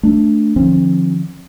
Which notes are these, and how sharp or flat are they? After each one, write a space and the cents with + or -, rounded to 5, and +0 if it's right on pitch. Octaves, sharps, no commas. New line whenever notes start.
A3 +0 D4 +0
D3 +45 F3 +0 C4 +40